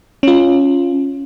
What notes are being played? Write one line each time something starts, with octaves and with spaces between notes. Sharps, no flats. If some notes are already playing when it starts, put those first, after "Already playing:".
C#4 F4